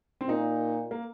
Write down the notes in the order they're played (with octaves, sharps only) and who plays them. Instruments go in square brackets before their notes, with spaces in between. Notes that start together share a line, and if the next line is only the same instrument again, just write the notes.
[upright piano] C4
[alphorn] A#2 [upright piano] D#4
[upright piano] A#3